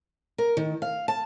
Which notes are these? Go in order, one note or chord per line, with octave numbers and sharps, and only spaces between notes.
A#4
D#3
F5
A5